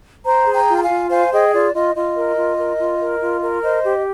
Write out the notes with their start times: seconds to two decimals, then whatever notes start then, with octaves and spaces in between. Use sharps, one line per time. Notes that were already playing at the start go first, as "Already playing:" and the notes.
0.25 C5 G5 A#5
0.47 G#4
0.53 G5 A#5
0.68 F4
0.77 A#5
0.82 F5 G#5
0.89 F4
1.09 C5 F5 G#5
1.31 G#4 D#5 G5
1.52 F4 D5
1.73 F4 D#5
1.95 F4 D#5
2.16 A#4
2.37 F4
2.58 A#4
2.79 F4
3.00 A#4
3.21 F4
3.42 A#4
3.63 C5 D#5
3.85 G4